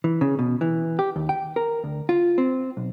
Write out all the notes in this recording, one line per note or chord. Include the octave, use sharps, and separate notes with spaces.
E3
C#3
B2
E3
G4
D#2
G5
A#4
D2
F4
C4
B1